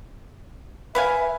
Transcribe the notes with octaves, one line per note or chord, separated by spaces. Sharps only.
B4 E5 F5 G#5